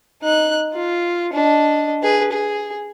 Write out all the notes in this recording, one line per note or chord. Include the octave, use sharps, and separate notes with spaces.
D#4 F#6
F4
D4 D#5
G#4 B4
G#4